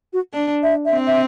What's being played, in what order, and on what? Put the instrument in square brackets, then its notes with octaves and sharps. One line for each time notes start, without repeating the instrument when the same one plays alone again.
[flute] F#4
[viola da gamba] D4
[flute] E5
E5
[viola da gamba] C4
[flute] E5